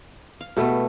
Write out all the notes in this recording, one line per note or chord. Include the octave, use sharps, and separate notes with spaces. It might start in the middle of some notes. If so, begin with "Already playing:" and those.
F5
B2 A3 B3 G4